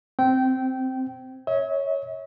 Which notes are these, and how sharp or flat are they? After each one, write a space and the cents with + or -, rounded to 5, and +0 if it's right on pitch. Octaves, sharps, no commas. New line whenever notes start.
C4 +0 G5 -20
C#5 +0 E5 -45